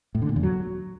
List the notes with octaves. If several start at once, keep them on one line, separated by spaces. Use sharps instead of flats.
A2
D3
A#2
E2
F#3